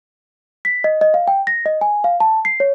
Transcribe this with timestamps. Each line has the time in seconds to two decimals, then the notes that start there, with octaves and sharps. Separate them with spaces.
0.65 B6
0.84 D#5
1.01 D#5
1.14 F5
1.28 G5
1.47 A#6
1.66 D#5
1.81 G#5
2.04 F5
2.20 A5
2.45 C7
2.60 C#5